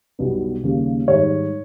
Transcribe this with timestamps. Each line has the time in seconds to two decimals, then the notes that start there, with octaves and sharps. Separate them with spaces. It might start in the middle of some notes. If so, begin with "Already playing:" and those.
0.19 B1 B2 G3 B3 D#4
0.63 D#2 C#3 G3 A#3
1.07 G#2 D#3 G3 C#5